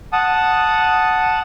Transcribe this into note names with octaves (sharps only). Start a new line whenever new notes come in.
F#5 A5 D#6